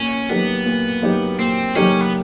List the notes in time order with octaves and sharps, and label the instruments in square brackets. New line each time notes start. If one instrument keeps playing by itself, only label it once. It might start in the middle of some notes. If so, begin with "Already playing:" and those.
Already playing: [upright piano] A#2 [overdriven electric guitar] C#4
[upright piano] F#3 A#3 D#4 G4 [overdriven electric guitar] B3
[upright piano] A#2
F#3 A#3 D#4 G4
[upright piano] A#2 [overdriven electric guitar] C4
[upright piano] F#3 A#3 D#4 G4 [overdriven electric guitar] C#4
[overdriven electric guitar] B3